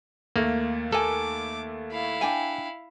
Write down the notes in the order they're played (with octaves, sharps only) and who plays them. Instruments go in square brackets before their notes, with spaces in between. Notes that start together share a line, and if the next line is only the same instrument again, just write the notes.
[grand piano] D#2 A3 [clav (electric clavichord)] A#3
[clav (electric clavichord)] A4 [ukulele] A#4 G#5 [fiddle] D6
[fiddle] E4 F5
[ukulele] D4 G5 G#5